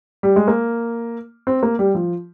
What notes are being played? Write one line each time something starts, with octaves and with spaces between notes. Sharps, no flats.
G3
G#3
A#3
C4
A#3
G3
F3